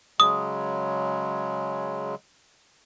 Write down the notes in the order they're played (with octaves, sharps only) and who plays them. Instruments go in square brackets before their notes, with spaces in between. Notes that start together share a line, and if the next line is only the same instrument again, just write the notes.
[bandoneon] C#3 F#3 G#3 [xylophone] D#6